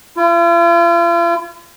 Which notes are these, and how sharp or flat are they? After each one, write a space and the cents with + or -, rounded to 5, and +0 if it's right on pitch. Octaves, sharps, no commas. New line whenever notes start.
F4 -45